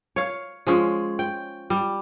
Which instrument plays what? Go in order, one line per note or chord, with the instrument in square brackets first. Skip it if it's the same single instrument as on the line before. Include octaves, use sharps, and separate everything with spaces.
[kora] C#5 F5
F3 G#3 C#4
G5
G3